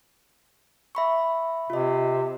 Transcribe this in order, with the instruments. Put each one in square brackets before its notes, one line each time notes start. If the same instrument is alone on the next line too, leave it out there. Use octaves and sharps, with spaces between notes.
[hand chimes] E5 B5 C#6
[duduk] C3 [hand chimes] F4 D#5